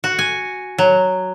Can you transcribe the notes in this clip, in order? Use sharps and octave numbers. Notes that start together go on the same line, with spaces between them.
F#4
G#5
F#3